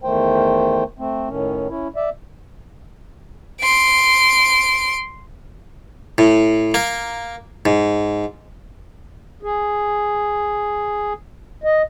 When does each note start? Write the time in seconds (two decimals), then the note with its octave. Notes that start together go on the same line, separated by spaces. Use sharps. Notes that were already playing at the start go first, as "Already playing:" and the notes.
0.03 E2 D#3 A3 C5 G5
0.99 A3 C4
1.29 A2 D#3 C#4
1.69 C#4 E4
1.96 D5 E5
3.61 C6 D7
6.18 A2
6.74 A#3
7.66 G#2
9.43 G#4
11.64 D#5